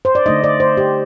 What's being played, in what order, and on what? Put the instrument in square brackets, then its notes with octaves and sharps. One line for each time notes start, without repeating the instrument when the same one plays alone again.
[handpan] C5
D5
D3 A3 D#4 D#5
D5
C5
G4